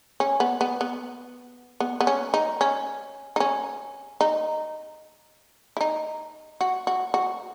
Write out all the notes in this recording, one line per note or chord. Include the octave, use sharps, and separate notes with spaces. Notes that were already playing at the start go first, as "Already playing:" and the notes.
C#4
B3
B3
B3
B3
B3
C#4
D#4
C#4
D#4
C#4
D#4
E4
D#4
F#4
F#4
F#4